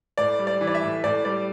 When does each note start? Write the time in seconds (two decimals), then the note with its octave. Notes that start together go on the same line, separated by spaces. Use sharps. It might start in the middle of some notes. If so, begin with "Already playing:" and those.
0.18 A2 D5
0.39 G3
0.47 D5
0.61 E3
0.67 D5
0.75 E5
0.82 A2
1.04 A2 D5
1.25 G3 D5